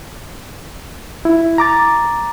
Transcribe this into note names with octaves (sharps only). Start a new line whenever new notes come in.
E4
A#5 D6 A6